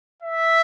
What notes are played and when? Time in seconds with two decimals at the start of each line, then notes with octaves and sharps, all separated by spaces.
0.22 E5